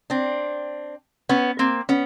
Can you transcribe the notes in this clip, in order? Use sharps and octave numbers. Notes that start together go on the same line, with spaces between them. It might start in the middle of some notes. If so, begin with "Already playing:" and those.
C4 D4
B3 C#4
A#3 C4
B3 C#4